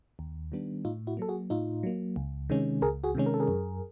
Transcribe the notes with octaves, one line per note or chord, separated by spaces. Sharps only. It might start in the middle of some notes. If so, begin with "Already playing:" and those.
D#2
D#3 G3 B3 D4
A2 D#4 F4
E4 F#4
F#3 A#3 A4
F#4 G#4
A2 D#4 F4
F#3 A#3
C#2
C3 D#3 G#3 C#4
C#2 G#4 A#4
F#4 G#4
C3 D#3 G#3 C#4
A#4
A4
G#4 A#4
F#2